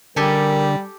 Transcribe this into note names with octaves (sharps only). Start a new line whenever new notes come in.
D3 G3 G4 A4 A#4 G#5